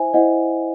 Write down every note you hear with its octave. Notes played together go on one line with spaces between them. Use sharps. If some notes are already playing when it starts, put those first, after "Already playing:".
Already playing: E4 C5 E5 G#5
E4 C5 D#5 F#5